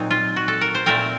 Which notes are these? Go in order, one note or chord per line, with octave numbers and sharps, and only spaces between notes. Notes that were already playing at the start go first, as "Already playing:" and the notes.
Already playing: A#2 F#3 C4 D#4
F4
F#4
A4
A#4
C5
A#2 A3 C4 A#4